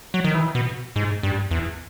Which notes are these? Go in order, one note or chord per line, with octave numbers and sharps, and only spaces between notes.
F#3
D#3
E3
B2
G#2
G2
E2